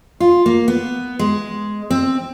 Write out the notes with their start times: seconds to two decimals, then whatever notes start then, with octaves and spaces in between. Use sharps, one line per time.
0.20 F4
0.46 A#3
0.68 B3
1.19 G#3
1.90 C4